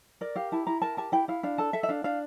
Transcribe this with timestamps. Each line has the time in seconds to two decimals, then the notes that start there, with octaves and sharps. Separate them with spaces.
0.21 A#4 D5
0.36 G4 F5
0.52 E4 A5
0.67 E4 A#5
0.82 A#4 A5
0.97 G4 A5
1.12 E4 G5
1.28 E4 F5
1.43 D4 F5
1.58 A4 A5
1.73 A4 E5
1.83 E5
1.89 D4 F5
2.04 D4 F5